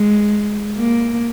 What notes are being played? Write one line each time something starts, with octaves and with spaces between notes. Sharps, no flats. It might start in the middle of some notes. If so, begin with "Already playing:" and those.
Already playing: G#3
A#3